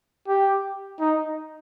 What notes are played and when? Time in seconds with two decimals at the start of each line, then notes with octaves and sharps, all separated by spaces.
0.28 G4
1.00 D#4